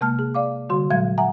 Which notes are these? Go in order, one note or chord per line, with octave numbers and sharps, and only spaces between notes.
C3 G#3 A#3 A5 F6
G#4
D5 F5 D6
D3 G3 F#4 C6
A#2 F#3 G#3 F5 G#6
E5 F#5 G#5 A#5